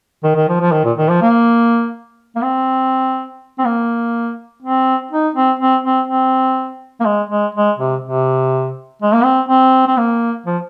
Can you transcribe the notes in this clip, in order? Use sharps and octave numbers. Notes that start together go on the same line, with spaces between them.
D#3
D#3
F3
F3
D#3
A#2
D#3
F3
A#3
A#3
C4
C4
A#3
C4
D#4
C4
C4
C4
C4
A#3
G#3
G#3
G#3
C3
C3
G#3
A#3
C4
C4
C4
A#3
F3